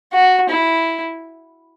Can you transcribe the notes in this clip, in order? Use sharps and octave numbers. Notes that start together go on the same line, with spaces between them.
F#4
E4